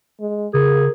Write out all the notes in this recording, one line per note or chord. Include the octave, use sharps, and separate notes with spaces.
G#3
C#3 G#4 A#4